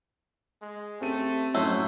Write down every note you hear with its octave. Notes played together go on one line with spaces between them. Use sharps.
G#3
A3 C4 G4 D#7
F#2 A2 F#3 A3 C5